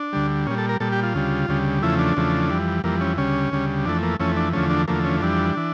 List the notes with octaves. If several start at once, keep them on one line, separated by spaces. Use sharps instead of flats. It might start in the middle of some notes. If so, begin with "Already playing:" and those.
Already playing: D4
D2 D3 G3
A#2 G3 C#4
A4
A#4
A#2 G3 A4
G4
F4
D2 C#3 G3
D2 C#3 G3
E2 C#3 F3 A3 E4
D4
E2 C#3 F3 A3
F2 E3 G3
F2 E3 G3 A#3
C#4
D2 C#3 G3 C#4
D2 C#3 G3
F2 E3 A3 D4
A#3
F2 E3 A3 C#4
D4
E2 D3 F3 A3 C#4
D4
E2 D3 F3 A3 A#3
C#4
F2 E3 G3 D4
E3